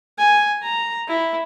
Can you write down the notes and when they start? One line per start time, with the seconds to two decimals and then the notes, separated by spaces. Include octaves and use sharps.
0.18 G#5
0.62 A#5
1.08 E4